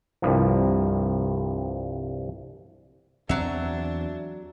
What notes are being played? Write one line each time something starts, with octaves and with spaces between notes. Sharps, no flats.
C2 G2 F3
E2 F#3 C4 D4 E5